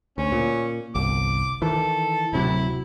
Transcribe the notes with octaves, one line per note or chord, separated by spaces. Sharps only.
D2 C#4
A#2
G1 C2 D6
D#3 E3 A4
D1 C3 F#3 E4